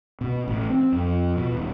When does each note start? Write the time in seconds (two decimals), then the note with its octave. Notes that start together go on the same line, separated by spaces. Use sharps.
0.21 B2
0.48 A1
0.70 C4
0.92 F2
1.37 B2
1.52 D#1